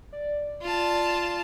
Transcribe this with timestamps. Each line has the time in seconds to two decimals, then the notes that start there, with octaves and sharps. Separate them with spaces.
0.13 D5
0.62 F4 A5